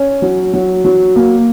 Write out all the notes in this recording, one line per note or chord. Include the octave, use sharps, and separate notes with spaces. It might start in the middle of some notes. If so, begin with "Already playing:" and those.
Already playing: C#4
F#3
F#3
F#3
A#3